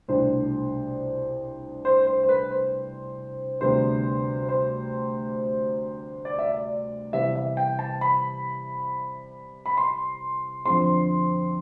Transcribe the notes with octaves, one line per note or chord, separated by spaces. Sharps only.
C2 B2 A3 D4 C5
C5
C5
C5
B4
C5
D2 C3 G3 B3 D4 C5
C5
D5
E5
D5
C3 E3 G3 B3 E5
E5
G5
A5
B5
B5
C6
F2 D3 F3 C4 C6